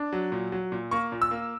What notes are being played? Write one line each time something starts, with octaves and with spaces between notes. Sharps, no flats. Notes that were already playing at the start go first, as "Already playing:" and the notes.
Already playing: D4
F#3
A#2
F#3
A#2
A#3 C#6
A#2
E6
A#3